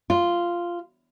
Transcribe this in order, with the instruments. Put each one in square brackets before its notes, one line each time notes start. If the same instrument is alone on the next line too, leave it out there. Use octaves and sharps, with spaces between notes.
[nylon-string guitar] F4